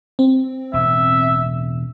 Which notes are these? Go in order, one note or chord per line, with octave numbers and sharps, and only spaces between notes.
C4
E1 A2 E5